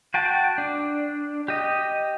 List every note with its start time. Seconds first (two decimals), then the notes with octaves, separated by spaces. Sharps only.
0.14 F#4 G5 A5
0.58 D4
1.48 G4 D#5